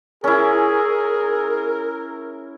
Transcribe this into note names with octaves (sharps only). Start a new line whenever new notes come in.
C#4 E4 G#4 A#4